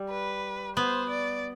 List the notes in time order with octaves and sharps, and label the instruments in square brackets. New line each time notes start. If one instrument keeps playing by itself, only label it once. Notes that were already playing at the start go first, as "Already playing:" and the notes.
Already playing: [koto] G3
[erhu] B4
[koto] B3 [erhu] C5
[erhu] D5